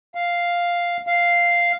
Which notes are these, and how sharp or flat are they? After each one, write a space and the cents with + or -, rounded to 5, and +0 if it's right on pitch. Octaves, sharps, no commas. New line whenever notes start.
F5 +0
F5 -5